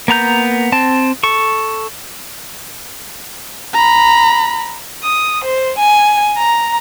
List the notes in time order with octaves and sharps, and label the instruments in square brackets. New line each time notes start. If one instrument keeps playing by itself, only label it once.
[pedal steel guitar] A#3 B3 A#5 G6
C4 A5
A4 C#6
[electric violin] A#5 B5
[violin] D#6
C5
G#5
A#5